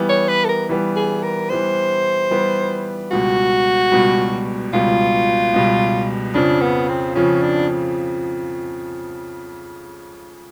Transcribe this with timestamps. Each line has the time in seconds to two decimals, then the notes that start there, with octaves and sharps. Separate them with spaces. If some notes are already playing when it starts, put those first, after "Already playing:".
Already playing: E3 G3 B3
0.09 C#5
0.29 B4
0.45 A4
0.49 A#4
0.69 E3 G3 B3
0.96 G#4
1.23 A#4
1.50 E3 G3 B3 C5
2.31 E3 G3 B3
3.11 C#2 B2 G3 F#4
3.92 C#2 B2 G3
4.73 C#2 B2 G3 F4
5.54 C#2 B2 G3
6.34 F2 C#3 F3 D4
6.61 B3
6.89 C4
7.15 F2 C#3 F3 C#4
7.42 D4